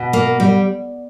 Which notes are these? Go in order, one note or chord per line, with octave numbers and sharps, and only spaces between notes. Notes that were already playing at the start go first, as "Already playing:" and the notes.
Already playing: B2
A#3
G3